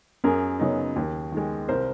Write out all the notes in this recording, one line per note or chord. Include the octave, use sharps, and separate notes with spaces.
F#2 G#4 A#4
C#3 F#3 B3 D#4
D#2
D#3 G#3
C2 A#4 C5